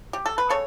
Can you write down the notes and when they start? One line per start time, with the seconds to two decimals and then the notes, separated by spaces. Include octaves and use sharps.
0.13 G4
0.26 A4
0.38 B4
0.50 C#3 A4 C#5